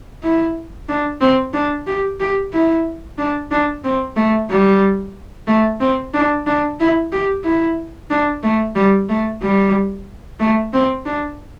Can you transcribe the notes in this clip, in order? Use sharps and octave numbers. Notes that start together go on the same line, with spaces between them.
E4
D4
C4
D4
G4
G4
E4
D4
D4
C4
A3
G3
A3
C4
D4
D4
E4
G4
E4
D4
A3
G3
A3
G3
A3
C4
D4